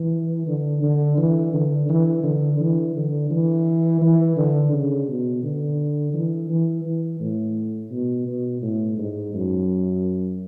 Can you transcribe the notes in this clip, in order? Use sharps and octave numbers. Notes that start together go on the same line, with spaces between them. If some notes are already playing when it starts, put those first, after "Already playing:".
Already playing: E3
D3
D3
E3
D3
E3
D3
E3
D3
E3
E3
D3
C#3
B2
D3
E3
E3
E3
A2
B2
B2
A2
G#2
F#2